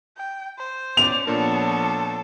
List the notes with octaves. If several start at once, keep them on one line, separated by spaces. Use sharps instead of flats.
G5
C5
C#4 D5 F7
A#2 F3 B3 D4 A4 A#4 C#5